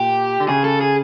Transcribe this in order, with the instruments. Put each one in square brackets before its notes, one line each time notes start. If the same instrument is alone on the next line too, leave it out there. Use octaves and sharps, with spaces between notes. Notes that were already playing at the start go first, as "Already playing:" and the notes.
Already playing: [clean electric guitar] A#2 [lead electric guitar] G4
[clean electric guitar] D3
[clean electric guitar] C#3 [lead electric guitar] G#4
[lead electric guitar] A4
G#4